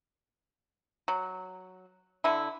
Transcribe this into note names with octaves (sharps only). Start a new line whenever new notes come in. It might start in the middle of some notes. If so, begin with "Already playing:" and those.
F#3
D3 E4